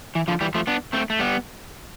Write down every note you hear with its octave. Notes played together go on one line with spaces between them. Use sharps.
E3
D3 F3
E3 G3
F3 A3
B3 D4
A3 C4
A3
G3 B3